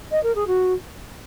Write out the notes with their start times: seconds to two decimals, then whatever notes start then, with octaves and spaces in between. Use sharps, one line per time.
0.11 D#5
0.23 A#4
0.35 G#4
0.47 F#4